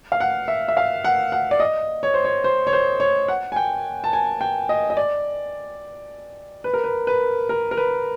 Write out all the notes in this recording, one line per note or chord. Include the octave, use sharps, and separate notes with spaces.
F5
F#5
E5
E5
F5
F#5
F#5
D5
D#5
C#5
C5
C#5
C5
C#5
C5
C#5
F#5
G#5
G5
A5
G#5
G5
D#5
D#5
D5
B4
A#4
B4
B4
A#4
A#4
B4